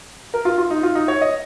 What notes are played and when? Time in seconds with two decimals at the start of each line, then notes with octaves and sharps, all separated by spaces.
0.34 A#4
0.45 F4
0.58 F4
0.70 D#4
0.83 F4
0.95 D#4
1.08 C#5
1.21 D#5